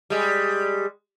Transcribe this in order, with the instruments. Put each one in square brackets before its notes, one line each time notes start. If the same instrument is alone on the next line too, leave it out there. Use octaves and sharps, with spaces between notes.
[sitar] G3 G#3